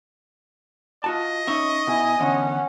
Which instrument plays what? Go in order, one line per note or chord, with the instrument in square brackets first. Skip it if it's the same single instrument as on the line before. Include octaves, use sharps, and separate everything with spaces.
[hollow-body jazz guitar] F4 F#4 A5 [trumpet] D#5
[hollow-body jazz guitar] C#4 D#4 E5 [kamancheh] C#6
[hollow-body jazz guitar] B2 [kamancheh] E4 G#5
[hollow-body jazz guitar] E2 D3 [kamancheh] C#4 F#5